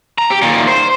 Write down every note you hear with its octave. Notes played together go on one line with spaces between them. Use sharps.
A#5
G4
A#2 D#3
C5